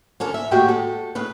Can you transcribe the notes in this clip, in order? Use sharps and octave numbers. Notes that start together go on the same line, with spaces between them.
D3 C#4 A4 A#4
E5
D#2 A2 G#3 F#4 G4 G5
A4
A2 C#3 B4